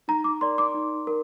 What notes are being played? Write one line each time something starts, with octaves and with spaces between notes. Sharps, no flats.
D#4 A#5
D6
A#4 D5 C6
D6
D#4
A#4